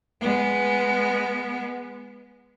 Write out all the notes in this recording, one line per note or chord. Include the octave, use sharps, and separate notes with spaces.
G#3 B3